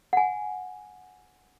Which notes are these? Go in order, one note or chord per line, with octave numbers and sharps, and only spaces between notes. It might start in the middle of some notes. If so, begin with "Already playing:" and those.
F#5 G#5